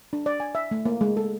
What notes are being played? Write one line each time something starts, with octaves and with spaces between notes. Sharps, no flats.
D4
D5
G#5
E5
A3
A#3
G#3
A4